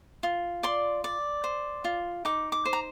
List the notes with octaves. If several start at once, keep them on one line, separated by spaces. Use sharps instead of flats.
F4
D5 C6
D5
C5
F4
D#4 D6
D6
C5
A#5